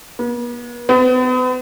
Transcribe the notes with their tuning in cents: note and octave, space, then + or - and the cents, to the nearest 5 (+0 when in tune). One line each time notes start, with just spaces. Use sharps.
B3 -45
B3 +40